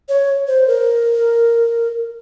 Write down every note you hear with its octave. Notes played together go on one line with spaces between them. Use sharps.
C#5
C5
A#4